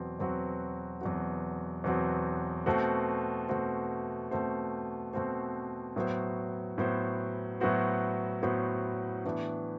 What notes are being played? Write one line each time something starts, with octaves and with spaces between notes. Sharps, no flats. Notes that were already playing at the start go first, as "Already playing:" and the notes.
Already playing: E2 B2 F#3 C4 F#4
E2 B2 F#3 C4 F#4
E2 B2 F#3 C4 F#4
E2 B2 F#3 C4 F#4
B2 A3 C4 F#4 C5
B2 A3 C4 F#4 C5
B2 A3 C4 F#4 C5
B2 A3 C4 F#4 C5
A2 F#3 B3 F#4 C5
A2 F#3 B3 F#4 C5
A2 F#3 B3 F#4 C5
A2 F#3 B3 F#4 C5
A2 E3 B3 D4